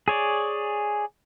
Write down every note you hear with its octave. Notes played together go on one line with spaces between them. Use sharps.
G#4 C#5 D5